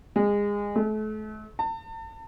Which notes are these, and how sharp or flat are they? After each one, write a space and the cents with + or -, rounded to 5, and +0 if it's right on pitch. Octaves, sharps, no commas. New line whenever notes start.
G#3 -25
A3 -35
A5 +40